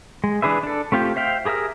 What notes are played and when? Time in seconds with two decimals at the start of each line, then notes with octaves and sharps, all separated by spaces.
0.24 G#3
0.42 E3 D4 G#4 B4 E5
0.63 D4 A4
0.92 A3 C4 F4 G4
1.16 C5 E5 F5 G5
1.45 G4 G#4 A#4 E5 F6